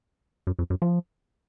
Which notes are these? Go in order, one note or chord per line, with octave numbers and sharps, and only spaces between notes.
F#2
F2
F#2
F3